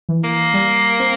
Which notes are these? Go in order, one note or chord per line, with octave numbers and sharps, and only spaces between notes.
E3
A#3
G3
C4